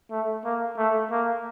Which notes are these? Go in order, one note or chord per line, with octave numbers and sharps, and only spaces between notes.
A3
A#3
A3
A#3